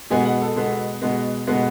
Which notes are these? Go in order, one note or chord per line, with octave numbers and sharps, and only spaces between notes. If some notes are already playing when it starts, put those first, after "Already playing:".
B2 G#3 B3 G#5
F#5
A4
B2 G#3 B3
B2 G#3 B3
B2 G#3 B3